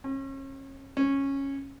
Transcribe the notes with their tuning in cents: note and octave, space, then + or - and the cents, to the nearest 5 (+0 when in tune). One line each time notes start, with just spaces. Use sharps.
C#4 -35
C#4 -10